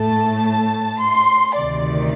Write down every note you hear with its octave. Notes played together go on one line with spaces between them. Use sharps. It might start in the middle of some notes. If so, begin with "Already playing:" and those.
Already playing: A2 A3 A5
C6
D2 C3 D#3 D5